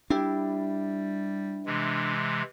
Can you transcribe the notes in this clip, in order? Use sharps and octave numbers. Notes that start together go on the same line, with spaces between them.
G3 D4 E4 G4
C3 E3 G#3